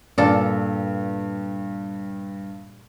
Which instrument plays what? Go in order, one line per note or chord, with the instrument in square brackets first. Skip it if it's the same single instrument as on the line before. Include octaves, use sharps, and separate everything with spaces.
[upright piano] G2 [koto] A#2 D4 A4